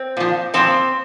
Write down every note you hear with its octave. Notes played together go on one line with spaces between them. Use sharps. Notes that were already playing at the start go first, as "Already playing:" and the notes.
Already playing: C4
A#2 F3
A#2 F3 C4